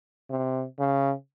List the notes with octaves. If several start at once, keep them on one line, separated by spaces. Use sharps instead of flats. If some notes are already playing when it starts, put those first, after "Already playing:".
C3
C#3